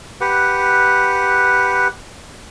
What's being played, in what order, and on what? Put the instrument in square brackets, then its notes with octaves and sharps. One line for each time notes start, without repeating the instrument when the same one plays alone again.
[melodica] G4 B4 F#5